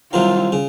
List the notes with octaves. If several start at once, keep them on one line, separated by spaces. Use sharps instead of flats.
C2 C3 D#3 F#3 F4
C#3